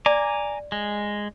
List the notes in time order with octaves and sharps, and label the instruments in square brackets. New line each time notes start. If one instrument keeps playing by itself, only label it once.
[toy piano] D5 [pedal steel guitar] G#5 A#5 D6
[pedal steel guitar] G#3